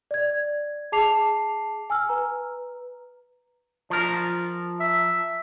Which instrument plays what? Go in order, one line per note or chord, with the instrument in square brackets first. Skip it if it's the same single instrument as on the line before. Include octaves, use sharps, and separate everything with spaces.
[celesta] D5 G#6
G#4 A5 D6 C7 F7
G#5 E6 F6
B4 A#5
[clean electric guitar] F3 A#4
[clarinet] E5